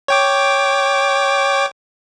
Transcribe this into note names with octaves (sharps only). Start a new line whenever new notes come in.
C#5 G5 D6